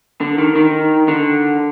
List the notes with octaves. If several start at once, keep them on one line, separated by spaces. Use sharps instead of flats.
D3
D#3
D#3
D3